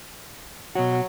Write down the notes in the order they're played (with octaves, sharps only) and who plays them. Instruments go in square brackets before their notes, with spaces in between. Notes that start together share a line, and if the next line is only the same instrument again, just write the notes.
[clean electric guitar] B2 F#4 [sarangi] F#3